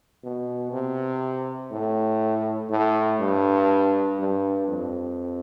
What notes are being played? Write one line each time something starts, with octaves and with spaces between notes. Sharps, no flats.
B2
C3
A2
A2
G2
G2
F2